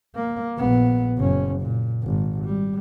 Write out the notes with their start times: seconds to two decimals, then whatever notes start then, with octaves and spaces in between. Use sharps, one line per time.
0.15 A#3
0.57 A#1 B3
1.17 F#1 C#4
1.60 A#2
2.03 G#1
2.44 G3